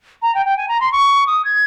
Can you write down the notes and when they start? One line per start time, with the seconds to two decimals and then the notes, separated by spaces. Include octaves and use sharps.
0.22 A#5
0.34 G5
0.46 G5
0.57 G#5
0.68 A#5
0.80 C6
0.92 C#6
1.27 D#6
1.45 G#6